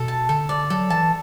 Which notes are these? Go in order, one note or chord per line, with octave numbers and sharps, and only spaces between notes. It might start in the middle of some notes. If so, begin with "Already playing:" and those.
Already playing: B2 A4
A5
D3 A4
D5
F#3 A4
E3 A5